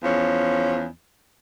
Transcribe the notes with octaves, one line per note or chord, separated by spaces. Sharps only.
E2 F3 C#4